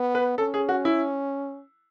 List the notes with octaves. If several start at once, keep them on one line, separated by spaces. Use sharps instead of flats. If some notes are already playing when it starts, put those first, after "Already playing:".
Already playing: B3
B4
C#4 A4
G#4
F#4
E4